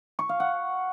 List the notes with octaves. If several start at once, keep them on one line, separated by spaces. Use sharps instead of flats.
C#6
F5
F#5